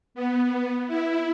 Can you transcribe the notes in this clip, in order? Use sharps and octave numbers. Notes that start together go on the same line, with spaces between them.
B3
E4